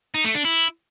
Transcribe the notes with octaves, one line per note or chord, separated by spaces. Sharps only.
D#4
A3
D4
E4